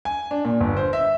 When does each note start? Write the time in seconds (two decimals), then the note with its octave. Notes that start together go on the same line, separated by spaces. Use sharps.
0.05 G#5
0.31 D4
0.45 A#2
0.60 G1
0.77 C5
0.93 E5